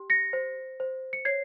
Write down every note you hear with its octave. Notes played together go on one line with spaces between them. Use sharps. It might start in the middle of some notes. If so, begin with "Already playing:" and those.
Already playing: G4
A#6 C#7
C5
C5
C#7
C#5 G#6 C7